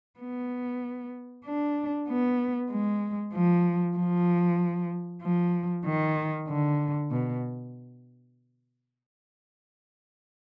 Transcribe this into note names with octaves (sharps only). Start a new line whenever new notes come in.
B3
D4
B3
G#3
F3
F3
F3
D#3
D3
B2